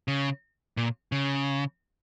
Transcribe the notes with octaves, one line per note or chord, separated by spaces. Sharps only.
C#3
A#2
C#3